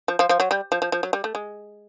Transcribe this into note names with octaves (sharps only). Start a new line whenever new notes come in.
F3
F3
F3
F#3
G3
F3
F3
F3
F#3
G3
A3
G#3